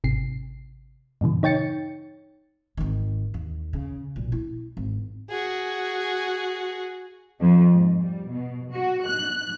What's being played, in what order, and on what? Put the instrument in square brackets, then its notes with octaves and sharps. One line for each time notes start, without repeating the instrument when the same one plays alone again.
[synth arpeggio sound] G#1 C3 C7
G2 A#2 C#3 E3
D#4 C#5 G5 A6 C#7
[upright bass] G#1 D#3
D#2
C#3
B1 A#2
E4
G#1
[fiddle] F#4 G#4
[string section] F2
G#2
G3
B2
F#4
F#6